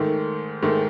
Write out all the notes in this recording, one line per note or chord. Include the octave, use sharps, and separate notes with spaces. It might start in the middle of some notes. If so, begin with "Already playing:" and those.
Already playing: G#2 D#3 A3
G#2 D#3 A3